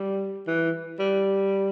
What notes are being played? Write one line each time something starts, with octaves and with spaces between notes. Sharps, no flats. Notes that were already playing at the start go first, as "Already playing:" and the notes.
Already playing: G3
E3
G3